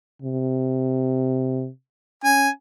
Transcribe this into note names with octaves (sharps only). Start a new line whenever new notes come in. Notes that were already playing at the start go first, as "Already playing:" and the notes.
C3
C#4 G#5